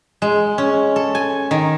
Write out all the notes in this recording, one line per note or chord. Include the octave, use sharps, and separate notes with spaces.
G#3
C#4
A4
G#5
D#3